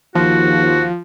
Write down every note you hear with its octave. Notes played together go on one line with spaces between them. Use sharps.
D#2 F3 F#4